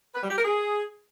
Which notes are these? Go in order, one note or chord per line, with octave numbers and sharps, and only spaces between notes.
B4
G3
G4
A#4
G#4